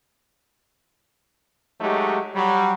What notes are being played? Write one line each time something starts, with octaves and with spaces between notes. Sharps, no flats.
F#3 G#3 A3 D#4 G4
F#3 G3